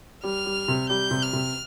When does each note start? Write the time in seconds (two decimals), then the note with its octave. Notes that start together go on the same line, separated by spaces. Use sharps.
0.24 G3 F6
0.46 G3
0.68 C3
0.90 G3 G6
1.11 C3
1.23 F6
1.33 C3